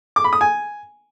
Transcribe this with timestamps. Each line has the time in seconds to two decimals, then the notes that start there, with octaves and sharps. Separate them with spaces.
0.16 D6
0.24 B5
0.33 D#6
0.41 G#5